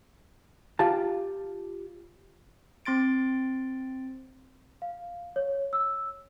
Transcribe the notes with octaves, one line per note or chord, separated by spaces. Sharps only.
F4 G4 A5
C4 C6 A6 D7
F5
C#5
E6